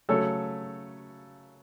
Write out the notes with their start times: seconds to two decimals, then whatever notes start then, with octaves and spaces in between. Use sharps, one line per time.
0.09 C#3 F#3 A3 A4 C#5